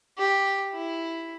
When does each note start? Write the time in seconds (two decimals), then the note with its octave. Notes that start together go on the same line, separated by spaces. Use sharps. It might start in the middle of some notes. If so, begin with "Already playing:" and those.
0.18 G4
0.73 E4